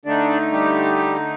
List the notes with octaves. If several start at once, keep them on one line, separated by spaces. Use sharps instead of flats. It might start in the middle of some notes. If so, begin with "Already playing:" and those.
D3 A3 D4 D#4 D5
G3 G4